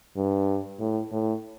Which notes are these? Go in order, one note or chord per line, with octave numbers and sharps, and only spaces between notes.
G2
A2
A2